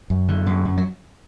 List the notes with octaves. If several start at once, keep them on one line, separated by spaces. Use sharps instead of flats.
F#2
D3
F#2
F#2
F#3